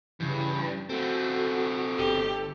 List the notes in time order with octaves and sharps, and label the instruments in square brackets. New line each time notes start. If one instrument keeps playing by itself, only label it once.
[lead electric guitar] G2 [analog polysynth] C#3 E3
[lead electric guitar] A3 C4 [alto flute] F#4 [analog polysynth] A4
[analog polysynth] G1 A4 [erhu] G4